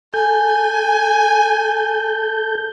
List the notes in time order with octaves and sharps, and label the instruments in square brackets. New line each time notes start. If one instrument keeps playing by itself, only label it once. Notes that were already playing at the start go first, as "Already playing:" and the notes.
[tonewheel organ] A4 G6 [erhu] G#5